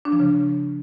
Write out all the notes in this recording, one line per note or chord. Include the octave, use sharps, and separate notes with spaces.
D4
F3
C#3